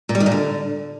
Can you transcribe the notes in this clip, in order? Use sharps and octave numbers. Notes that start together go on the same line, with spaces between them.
A#2
G3
D#3
A#2
D3